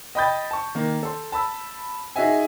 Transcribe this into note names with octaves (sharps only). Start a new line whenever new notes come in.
D#5 G5 B5 D#6 G6 A6
A5 C#6
D#3 A#3
A4 C6
A5 B5 E6
D#4 F#4 G#4 D#5 E5 G#5